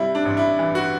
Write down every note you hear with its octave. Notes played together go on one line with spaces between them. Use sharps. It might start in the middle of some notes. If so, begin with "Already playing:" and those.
Already playing: C3 G3 E4
D4
A1
E4
E3
F#4